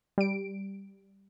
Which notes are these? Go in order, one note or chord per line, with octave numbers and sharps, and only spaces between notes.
G3 D7